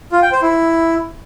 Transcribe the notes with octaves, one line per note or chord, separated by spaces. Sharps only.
F4
G5
C5
E4